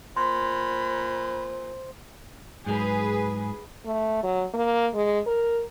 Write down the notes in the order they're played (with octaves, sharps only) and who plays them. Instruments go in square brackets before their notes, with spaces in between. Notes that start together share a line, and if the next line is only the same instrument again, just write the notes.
[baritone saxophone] A#2 [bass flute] C5 [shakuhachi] B5 [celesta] C6
[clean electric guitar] G#2 F#3 [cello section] G#4 B4
[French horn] A3
F#3
A#3
G#3
A#4